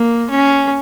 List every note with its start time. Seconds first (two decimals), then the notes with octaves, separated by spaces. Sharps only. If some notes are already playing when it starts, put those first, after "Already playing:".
Already playing: A#3
0.30 C#4